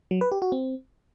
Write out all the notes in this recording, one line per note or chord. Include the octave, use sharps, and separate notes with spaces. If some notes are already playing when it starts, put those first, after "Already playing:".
F#3
B4
G4
F#4
C4